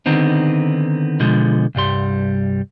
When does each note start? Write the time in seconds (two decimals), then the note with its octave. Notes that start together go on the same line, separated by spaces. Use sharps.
0.06 D3 D#3 B3 C4 D#4
1.20 B2 D3 F3 G#3
1.75 C2 G2 G3 C6